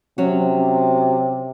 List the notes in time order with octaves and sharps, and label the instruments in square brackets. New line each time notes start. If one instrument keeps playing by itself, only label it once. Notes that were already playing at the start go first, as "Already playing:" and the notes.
[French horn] C3 [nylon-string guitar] F#3 C#4 F#4